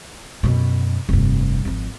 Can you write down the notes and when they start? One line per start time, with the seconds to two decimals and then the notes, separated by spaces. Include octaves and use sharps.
0.43 F#2 B2
1.09 F1 G2
1.65 G#1 F3